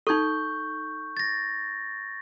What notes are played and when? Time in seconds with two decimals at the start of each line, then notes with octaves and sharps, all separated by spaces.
0.07 D#4 A4 C#6 G6
1.17 A6 A#6